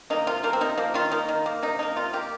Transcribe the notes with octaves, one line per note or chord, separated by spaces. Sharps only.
D#3 A#3 D#4
C3 F4
F3 A#3 A#4
C4
C3 D#4
F3 A#3
D#3 F4
A#3 D#4
D#3
A#3
C3 D#4
D#3 A#3 D#4
C3 F4
D#3 A#3 G4